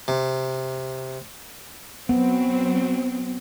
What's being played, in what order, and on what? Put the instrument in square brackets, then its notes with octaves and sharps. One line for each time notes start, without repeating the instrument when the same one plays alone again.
[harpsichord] C3
[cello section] F#3 C4 [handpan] B3